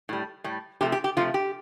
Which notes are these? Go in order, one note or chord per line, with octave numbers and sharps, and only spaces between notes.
A2 G3
A2 G3
C3 F3 A3 G4
G4
G4
C3 F3 A3 F4
G4